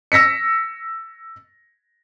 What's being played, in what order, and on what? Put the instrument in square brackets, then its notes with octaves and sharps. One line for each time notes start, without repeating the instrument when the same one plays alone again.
[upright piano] E6 A#6 B6 C#7